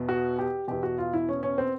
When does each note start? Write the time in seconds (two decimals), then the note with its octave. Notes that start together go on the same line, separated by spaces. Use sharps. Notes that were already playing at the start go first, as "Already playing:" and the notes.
Already playing: E2 B2
0.09 F#4
0.39 G4
0.68 E2 B2 G4
0.83 F#4
0.98 F4
1.13 E4
1.29 C#4
1.43 C#4
1.58 C4